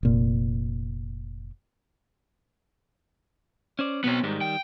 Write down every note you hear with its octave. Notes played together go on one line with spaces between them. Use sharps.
F1 A#2
C#4 C5 D5
B1 B2 B3 C4 C#5
G#2 D#3 G3
G5